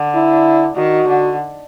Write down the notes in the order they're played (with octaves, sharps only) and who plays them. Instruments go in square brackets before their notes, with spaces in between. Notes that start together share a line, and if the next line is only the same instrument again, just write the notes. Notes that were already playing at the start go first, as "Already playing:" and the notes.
Already playing: [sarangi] D3
[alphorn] E4
[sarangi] D#3 [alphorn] F#4
[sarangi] D3